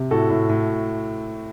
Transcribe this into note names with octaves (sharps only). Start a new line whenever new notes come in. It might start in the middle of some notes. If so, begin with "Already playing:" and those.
Already playing: C3
A2 F#4 A4
A2
A2